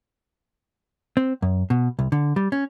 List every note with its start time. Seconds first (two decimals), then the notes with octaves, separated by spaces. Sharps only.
1.17 C4
1.42 F#2
1.70 B2
1.99 C2
2.12 D3
2.36 G3
2.52 C#4